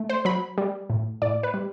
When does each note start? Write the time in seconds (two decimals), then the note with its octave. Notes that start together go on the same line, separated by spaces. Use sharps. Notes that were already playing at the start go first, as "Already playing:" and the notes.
Already playing: A3
0.09 C5
0.25 F#3 B5
0.58 G3
0.90 A2
1.22 A2 D5
1.43 B4
1.54 G3